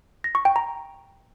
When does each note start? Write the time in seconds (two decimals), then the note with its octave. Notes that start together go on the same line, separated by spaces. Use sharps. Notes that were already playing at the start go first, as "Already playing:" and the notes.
0.24 A#6
0.35 C#6
0.45 G5
0.56 A#5